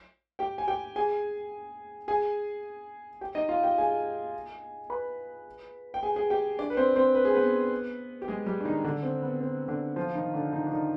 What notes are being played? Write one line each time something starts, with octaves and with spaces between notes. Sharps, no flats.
G4 G5
G#5
G4 G5
G#4 G#5
G#4 G#5
G4 G5
D#4 D#5
F4 F5
G4 G5
G#4 G#5
B4 B5
G5
G#4 G#5
G#4 G#5
G4 G5
D4 D5
B4
C4 C5
C4 C5
B4
G#4
B3 B4
G4
G#3 G#4
G3 G4
D4
D#3 D#4
D3 D4
C4
B3
C4
D3 D4
F3 F4
D#3 D#4
D3 D4
D#3 D#4
D4
D#3 D#4